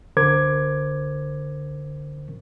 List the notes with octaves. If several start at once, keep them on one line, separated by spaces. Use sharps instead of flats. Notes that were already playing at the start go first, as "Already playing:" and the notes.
C2 D3 A#4 C5 D6 G#6